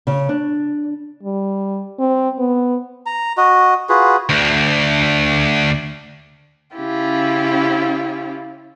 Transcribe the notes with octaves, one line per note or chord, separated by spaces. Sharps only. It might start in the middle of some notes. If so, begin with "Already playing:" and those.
C#3
D4
G3
C4
B3
A#5
F#4 D#5
F4 F#4 G#4 B4
D2 D3
C#3 C#4 E4 F4 G4